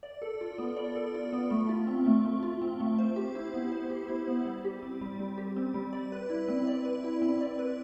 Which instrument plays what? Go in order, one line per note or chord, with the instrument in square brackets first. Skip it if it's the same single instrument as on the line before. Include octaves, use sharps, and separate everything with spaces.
[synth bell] D5
A4
F4
B3
D5
A4
F4
B3
A3
F4
C4
A3
A3
F4
C4
A3
C5
G4
E4
B3
C5
G4
E4
B3
G3
G4
C4
G3
G3
G4
C4
G3
D5
B4
E4
C4
D5
B4
E4
C4
D5
B4